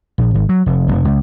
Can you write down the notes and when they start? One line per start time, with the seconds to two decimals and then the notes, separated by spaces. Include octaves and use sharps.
0.18 A#1
0.34 G#1
0.49 F#3
0.66 F1
0.88 F1
1.05 C#2